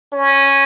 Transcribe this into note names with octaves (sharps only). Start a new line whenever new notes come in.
C#4